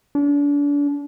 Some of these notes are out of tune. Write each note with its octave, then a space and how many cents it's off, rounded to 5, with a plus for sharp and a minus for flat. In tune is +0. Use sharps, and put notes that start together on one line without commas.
D4 -35